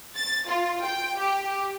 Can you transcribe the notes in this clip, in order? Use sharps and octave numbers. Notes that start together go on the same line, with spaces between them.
A6
F4
G5
G4